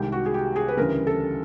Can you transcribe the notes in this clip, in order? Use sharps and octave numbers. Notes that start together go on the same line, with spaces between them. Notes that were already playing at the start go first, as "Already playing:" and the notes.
Already playing: C2 C3 D#3 G#3 G4
F#4
G#4
G4
G#4
B4
D2 C#3 E3 G3 A#4
A4